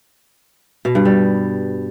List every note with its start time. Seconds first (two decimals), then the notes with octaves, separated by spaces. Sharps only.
0.85 B2
0.95 G2
1.05 G3